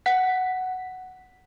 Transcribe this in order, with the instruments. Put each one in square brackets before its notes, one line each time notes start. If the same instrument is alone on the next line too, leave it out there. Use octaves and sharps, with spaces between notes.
[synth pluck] F#5 B6